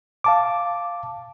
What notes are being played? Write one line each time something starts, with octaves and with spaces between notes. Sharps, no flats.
F5 A5 D6